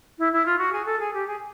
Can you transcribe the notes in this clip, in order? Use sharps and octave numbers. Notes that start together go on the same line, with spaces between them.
E4
E4
F4
F#4
G#4
A4
G#4
G4
G#4